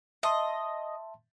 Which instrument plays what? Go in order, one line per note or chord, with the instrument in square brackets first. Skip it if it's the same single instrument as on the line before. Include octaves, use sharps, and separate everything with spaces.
[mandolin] D#5 [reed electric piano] E5 A5 C6